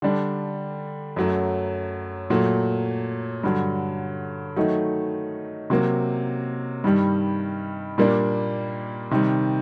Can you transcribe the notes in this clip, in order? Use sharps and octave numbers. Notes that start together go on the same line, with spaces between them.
D3 G3 D4
F#2 F#3 A3
A#2 F#3 A3
G2 D3 F#3
D#3 F#3 A3 D#4
C3 F#3 A#3
G2 D#3 G3
A#2 G3 A#3 D4
C3 D#3 G3